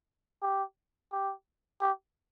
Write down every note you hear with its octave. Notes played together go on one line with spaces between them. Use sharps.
G4
G4
G4